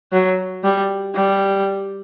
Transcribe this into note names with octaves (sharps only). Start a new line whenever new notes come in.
F#3
G3
G3